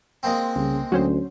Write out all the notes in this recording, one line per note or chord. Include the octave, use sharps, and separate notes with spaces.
G#3 A#3 C4
C2 C#3
D2 F#3 C#4 C5